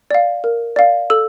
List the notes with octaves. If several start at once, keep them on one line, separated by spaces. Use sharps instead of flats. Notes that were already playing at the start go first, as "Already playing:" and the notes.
D5 F5
A#4
D5 F5
A4 E6